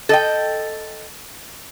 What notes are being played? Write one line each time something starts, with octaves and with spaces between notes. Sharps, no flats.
A4 D#5 G5